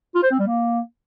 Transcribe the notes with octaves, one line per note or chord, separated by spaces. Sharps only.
F4
C5
C4
G3
A#3